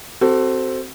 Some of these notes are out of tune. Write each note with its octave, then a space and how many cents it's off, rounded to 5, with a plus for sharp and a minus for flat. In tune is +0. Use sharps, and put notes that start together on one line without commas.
C4 +0 F#4 +30 A4 +10